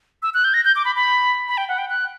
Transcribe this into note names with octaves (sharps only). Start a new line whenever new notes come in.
E6
F#6
G6
A#6
G6
D6
B5
B5
B5
G5
F#5
G5
F#6